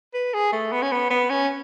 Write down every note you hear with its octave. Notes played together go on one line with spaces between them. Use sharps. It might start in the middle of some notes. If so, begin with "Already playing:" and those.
B4
G#4
A3
B3
C#4
B3
B3
C#4